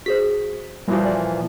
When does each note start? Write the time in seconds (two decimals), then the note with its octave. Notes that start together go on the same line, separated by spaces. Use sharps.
0.06 F#4 G#4 C5 B6
0.88 A#2 E3 F3 G3 F#4
1.05 D5